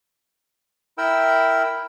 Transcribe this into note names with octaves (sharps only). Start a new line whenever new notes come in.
E4 A#4 G5 E6